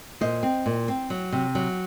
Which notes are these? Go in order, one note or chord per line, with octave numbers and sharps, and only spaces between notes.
A#2 C5 D#5
C4
A#2
C4
F#3
C3
F#3